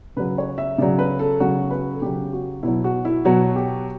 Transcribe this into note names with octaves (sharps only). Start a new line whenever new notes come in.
C#3 F#3 B4
C#5
E5
C#3 F#3 D5
B4
A4
C#3 F#3 F#4
B4
A4
C#3 F#3 G4
F#4
B2 F#3 E4
F#4
E4
B2 F#3 F#4
G4